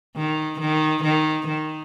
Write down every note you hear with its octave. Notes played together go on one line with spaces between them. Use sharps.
D#3
D#3
D#3
D#3